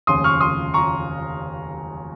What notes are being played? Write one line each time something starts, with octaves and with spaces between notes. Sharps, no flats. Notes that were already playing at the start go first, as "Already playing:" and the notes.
F1 D#2 C#3 C6 D#6
C#6 F6
C6 D#6
A#5 C#6